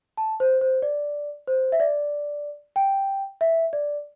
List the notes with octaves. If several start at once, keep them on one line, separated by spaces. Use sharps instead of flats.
A5
C5
C5
D5
C5
E5
D5
G5
E5
D5